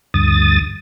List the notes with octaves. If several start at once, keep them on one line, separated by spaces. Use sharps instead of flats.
D2 G2 D#6 A6